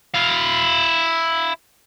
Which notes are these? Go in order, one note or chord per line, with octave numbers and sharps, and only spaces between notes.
E4 F5